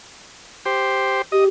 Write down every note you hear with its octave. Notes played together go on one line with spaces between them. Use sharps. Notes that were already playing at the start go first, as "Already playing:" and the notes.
G4 C5
G4 D#5